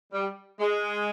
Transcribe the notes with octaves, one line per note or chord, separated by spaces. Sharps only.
G3
G#3